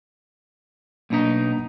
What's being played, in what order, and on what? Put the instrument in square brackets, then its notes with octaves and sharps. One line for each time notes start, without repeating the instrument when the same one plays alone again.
[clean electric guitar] B1 B2 D#4 [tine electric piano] A#3 D4